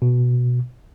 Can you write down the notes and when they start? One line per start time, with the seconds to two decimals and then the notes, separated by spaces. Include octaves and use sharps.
0.02 B2